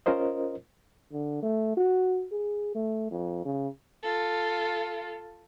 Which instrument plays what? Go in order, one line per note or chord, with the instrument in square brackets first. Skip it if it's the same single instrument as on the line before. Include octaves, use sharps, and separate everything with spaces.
[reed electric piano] C#4 F4 A#4 C5 D#5
[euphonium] D3
A3
F#4
G#4
A3
F2
C#3
[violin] F4 A4